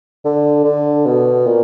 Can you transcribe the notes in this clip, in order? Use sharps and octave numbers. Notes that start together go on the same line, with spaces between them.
D3
D3
B2
A#2